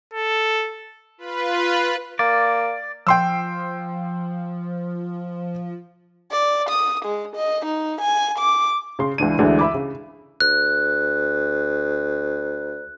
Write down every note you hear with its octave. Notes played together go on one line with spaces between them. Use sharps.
A4
F4 B4
A#3 D5
F3 G5 C6 E6
D5
D#6
G#3
D#5
D#4
G#5
D6
C#3 C6
C#2 E3 D4 D#7
D2 D3 E3 G#3 D4
E5 B5 D6
C#3
D2 F#6